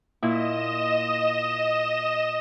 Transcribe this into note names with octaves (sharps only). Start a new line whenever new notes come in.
A#2 E4 D#5 E7